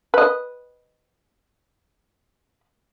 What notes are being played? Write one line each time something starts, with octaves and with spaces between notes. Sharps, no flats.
B4 D#5